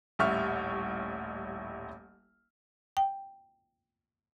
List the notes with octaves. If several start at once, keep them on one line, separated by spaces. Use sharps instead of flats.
D#1 A1 G3 E5 C#6 F6
G5